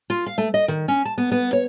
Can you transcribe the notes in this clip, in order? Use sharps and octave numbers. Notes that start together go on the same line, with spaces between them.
F4
F5
A3
D#5
D#3
C#4
A5
B3
B3
C#5